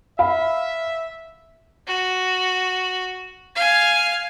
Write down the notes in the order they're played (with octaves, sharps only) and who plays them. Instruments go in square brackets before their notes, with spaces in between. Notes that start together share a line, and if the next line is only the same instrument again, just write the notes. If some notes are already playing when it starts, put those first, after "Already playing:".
[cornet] E5 [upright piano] F5 B5
[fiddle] F#4
F5 G#5